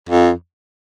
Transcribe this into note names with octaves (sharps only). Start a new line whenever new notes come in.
F2